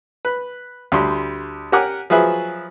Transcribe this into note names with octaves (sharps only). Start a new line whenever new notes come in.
B4
D2 G3 C6
G4 A#4 F#5 G#5 D6
F3 F#3 G#4 B4 E5